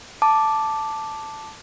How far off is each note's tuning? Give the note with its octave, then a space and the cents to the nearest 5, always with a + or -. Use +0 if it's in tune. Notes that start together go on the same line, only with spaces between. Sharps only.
A5 +0 D6 +0